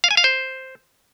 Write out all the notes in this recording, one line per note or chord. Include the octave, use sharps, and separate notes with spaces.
F5
G#5
F5
C5